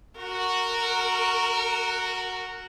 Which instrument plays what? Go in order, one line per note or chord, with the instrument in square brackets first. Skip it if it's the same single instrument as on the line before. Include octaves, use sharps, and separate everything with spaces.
[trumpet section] F#4 [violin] A#4